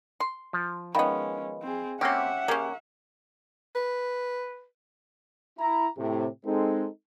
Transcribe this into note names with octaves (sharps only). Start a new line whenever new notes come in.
C6
F3
D#3 G#3 B3 C#4 D#5 F5 B5
C4 G#4
A#3 C4 C#4 G4 E5 F#5
A#3 C#4 G4 G#4
B4
E4 A#5
A2 C3
G#3 C4 D#4 A4